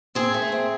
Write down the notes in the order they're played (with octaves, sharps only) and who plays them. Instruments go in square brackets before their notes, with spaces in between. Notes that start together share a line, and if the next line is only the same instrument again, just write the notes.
[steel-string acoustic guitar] C4 G#4
A3
C4